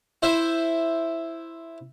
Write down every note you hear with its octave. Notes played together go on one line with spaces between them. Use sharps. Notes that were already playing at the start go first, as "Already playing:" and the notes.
E4 C5 E5